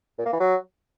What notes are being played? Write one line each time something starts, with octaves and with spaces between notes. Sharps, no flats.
A#2
A#3
E3
F#3